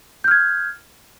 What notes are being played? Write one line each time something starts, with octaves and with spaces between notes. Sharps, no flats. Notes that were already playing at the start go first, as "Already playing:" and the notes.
F6 G6 G#6